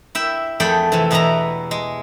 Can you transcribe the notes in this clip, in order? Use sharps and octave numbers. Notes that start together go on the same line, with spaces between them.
E4 E5 G5
F2 A3 G#4 D5 G5 B5
C3 E3
E2 B2 E4 B4 A#5
G#3